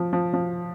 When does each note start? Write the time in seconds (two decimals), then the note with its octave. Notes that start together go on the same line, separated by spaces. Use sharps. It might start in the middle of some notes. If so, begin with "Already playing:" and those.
Already playing: F3
0.13 F3
0.34 F3